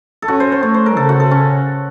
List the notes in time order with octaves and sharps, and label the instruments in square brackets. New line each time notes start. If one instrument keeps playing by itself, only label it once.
[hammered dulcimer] A4
[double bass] C#4 [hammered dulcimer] F#4
[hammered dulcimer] C5
C5
[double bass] A3 [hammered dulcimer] C#5
[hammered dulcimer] C5
A#4
[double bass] C#3 [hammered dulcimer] A4
[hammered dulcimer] F#4
A4
C#4